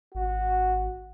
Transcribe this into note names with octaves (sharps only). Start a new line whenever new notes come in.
G#1 F#4